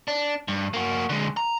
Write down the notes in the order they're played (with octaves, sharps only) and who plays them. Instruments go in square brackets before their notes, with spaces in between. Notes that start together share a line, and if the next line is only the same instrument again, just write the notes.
[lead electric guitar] D4
G2
A#3 F#4
D3 G#3
A#5